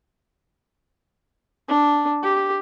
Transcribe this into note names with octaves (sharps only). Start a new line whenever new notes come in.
D4
G4